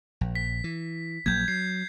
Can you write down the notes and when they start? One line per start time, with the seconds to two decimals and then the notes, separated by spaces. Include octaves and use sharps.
0.21 A#1
0.35 B6
0.64 E3
1.26 A#1 F#3 A#3 G6 G#6
1.48 F#3 C7